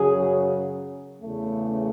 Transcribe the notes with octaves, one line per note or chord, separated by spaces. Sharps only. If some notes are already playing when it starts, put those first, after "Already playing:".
Already playing: F#2 C#3 F#3 G#4
E2 C#3 E3 A3